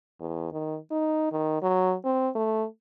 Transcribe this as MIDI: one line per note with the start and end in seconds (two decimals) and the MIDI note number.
0.20 0.51 40
0.52 0.77 51
0.91 1.29 63
1.32 1.62 51
1.62 1.94 54
2.05 2.29 60
2.35 2.66 57